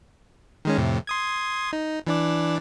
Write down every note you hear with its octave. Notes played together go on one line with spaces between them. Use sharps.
D#3 G#3 C#4
F2 A2 C3
C6 D#6 G#6
D#4
E3 D4 D5